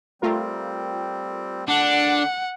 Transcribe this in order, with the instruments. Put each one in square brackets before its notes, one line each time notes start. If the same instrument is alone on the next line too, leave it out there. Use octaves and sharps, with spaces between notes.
[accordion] G3 C4 [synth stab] A3 F4 A#4
[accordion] D3 [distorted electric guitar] D4 [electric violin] F#5